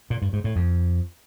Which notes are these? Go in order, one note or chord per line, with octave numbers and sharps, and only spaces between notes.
A#2
G2
G#2
A2
F2